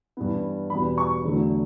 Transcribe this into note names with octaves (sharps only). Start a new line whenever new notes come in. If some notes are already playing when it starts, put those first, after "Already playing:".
G2 E3 B3
E2 B2 G3 B3 B5
C#6
E2 D3 F#3 A3